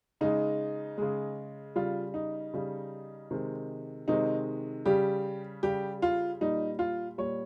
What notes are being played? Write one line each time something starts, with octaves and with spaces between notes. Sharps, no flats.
C#3 G#3 D#4
C#3 G#3
C#3 G3 F4
D#4
C#3 G3
C3 D#3 G#3
C3 D#3 G#3 D#4
C#3 G3 G4
C#3 G3 G4
F4
A#2 G3 D#4
F4
A#2 G3 C#5